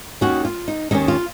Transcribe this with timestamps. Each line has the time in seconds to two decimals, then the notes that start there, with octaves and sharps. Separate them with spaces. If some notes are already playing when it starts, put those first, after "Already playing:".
0.21 D#2 D#3 A#3 C#4 F#4
0.45 F4
0.68 D#4
0.91 D#2 D#3 A#3 C#4 D#4
1.08 F4